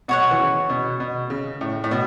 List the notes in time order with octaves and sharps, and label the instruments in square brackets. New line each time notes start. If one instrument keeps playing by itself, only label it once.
[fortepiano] B2 [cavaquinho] F#4 C#5 F#5
[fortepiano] E3
C#3
B2
B2
C#3
A2
A2
B2